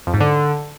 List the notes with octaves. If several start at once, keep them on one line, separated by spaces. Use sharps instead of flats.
F2
G#2
D3